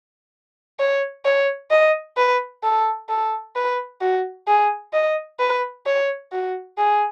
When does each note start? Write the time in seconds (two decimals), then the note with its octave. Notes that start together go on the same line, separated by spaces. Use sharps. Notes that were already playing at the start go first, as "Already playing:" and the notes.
0.79 C#5
1.25 C#5
1.71 D#5
2.17 B4
2.64 A4
3.09 A4
3.56 B4
4.01 F#4
4.48 G#4
4.93 D#5
5.40 B4
5.86 C#5
6.32 F#4
6.78 G#4